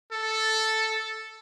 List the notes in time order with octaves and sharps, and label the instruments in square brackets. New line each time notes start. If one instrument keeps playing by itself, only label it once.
[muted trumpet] A4